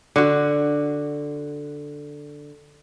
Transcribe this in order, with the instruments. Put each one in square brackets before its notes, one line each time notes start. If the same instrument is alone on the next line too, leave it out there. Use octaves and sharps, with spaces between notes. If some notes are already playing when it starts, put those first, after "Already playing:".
[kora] D3 F#4